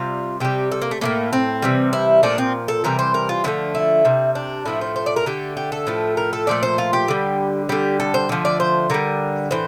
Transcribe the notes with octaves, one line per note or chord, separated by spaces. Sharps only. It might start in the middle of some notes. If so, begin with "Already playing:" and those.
Already playing: C3 G3 F4
C3 G3 G4
A4
A#3
A3
A2 E3 A3 A#3
C4
C3 E3 G3
E4
A#2 F3 A3 D4
C4
A4
C3 E3 G3 A#4
C5
A#4
F4
D3 F3 A3 E4
E4
C3 G3
D4
A2 F3 A3 E4
C5
C5
D5
A#4
D3 A3 G4
G4
A4
A2 F3 A3
A#4
A4
A#2 F3 A3 D5
C5
F4
G4
D3 G3
D3 G3 G4
A4
C5
D3 F3 A3
D5
C5
D3 G3 A#4
A2 E3 C5